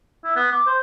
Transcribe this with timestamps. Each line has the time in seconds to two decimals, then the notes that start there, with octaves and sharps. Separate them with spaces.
0.24 E4
0.36 B3
0.52 D6
0.67 C5